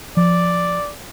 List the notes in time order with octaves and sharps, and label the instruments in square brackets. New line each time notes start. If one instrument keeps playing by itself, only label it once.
[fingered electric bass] F3 [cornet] D5